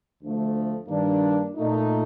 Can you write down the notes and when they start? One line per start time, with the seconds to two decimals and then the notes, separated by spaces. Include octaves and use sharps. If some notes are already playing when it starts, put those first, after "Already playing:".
0.22 D2 D3 F3 A3
0.88 G2 D#3 A#3 D4
1.54 A#2 A3 D#4